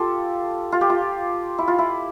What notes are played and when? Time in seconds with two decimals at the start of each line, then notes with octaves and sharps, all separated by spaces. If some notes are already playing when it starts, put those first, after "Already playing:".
Already playing: F4 G4 A4
0.72 F4
0.81 G4
0.90 F4
1.58 E4
1.68 F4
1.78 E4